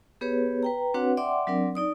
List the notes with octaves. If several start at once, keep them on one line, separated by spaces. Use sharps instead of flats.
B3 G4 G#4 B4 C#5
B4 G5 A#5
C4 D4 F#4 B4 C#5 F#5
D5 E5 F#5 G5 C6 D6
F#3 C4 D4 A#4 D5
D#4 D5 D#6